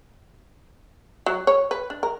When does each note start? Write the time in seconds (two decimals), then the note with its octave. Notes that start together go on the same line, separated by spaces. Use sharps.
1.26 F#3
1.47 C#5
1.71 B4
1.90 D4
2.03 A#4